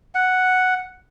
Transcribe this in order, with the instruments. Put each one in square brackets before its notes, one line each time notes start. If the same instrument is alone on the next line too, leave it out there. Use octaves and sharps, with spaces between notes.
[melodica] F#5